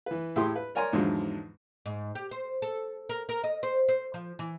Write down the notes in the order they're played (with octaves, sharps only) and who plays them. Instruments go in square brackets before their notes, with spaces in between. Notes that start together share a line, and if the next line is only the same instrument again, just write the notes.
[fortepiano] E3 B4
A2 E4 G4 G#4 C6
B4
A#4 C#5 D5 G#5 A#5 C6
E2 G#2 D3 F3 F#3 G#3
[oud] G#2
G4
C5
A4
A#4
A#4
D#5
C5
C5
F3
E3